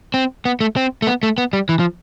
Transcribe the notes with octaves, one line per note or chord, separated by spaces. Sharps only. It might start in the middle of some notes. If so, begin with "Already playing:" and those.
C4
B3
A3
C4
A3
B3
A3
B3
G3
E3
F3